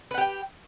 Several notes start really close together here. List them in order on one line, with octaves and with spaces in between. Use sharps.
B4 F#5 G4 G5